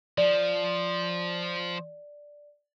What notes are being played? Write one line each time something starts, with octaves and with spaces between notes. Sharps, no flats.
F3 D5